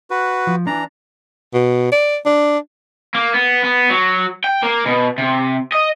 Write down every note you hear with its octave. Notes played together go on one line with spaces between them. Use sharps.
F#4 B4
F3
E3 D4 A#5
B2
D5
D4
A#3
B3
B3
F#3
G5
A#3
B2
C3
D#5